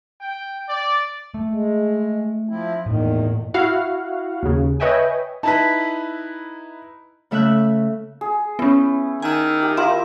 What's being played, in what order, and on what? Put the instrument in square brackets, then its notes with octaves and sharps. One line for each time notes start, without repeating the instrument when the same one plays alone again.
[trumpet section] G5
D5
[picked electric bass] A3
[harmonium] G#3
F3 C4 E4
[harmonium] E2 D#3 [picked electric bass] A2 A#3
[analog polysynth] E4 F#4 F5 F#5
D#2 C#3
B4 C#5 D#5 E5 G5 G#5
[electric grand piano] D#4 E4 B4 [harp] A5 B6
[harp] C#3 A3 E5 E6 F#6
[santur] G#4
[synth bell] B3 C#4 [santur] E4
[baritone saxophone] D#3 [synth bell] G#5 E6
[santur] G4
[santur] E4 F4 A#4 [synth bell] E5